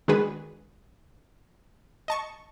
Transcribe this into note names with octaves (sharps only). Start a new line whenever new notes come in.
D#3 G#3 D4 F#4 G#4 B4
D#5 A5 C#6